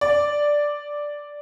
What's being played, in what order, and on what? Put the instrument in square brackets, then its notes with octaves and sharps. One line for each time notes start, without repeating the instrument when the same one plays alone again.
[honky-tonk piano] D5